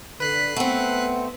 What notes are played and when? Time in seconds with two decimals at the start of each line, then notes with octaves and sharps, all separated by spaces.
0.20 D3 B4 F#6 B6 C7
0.56 A3 B3 C4 F#5